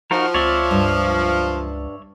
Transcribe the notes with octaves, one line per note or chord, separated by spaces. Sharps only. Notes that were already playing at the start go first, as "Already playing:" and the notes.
F3 D#4 F#4 A#4
C#2 C4 F4 C#5 D5 E5
G2